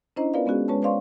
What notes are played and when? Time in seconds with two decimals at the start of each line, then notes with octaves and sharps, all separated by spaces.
0.16 C#4 D4 E4 C5 D#5 A#5
0.34 B3 F4 A#4 B4 D5 F5
0.46 G#3 B3 C#4 F#4 G#4
0.68 G#3 C#4 B4 C#5 A5
0.82 B4 C5 D5 F5 C6 C#6